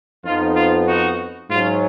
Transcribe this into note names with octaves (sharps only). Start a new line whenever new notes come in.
F2 F3 B3 D#4 F4
F4
D#4 F#4
G#2 F#3 C#4 F4